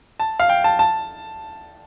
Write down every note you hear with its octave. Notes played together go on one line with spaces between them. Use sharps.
A5
F5
G5
A5
A5